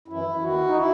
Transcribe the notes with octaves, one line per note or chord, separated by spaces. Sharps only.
F#2 E3 E4
D#2 D#3 F#4
D#4
E4